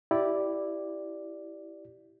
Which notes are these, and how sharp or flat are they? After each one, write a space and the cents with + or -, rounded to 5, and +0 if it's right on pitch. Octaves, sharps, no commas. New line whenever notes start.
E4 +0 G4 -15 D5 +0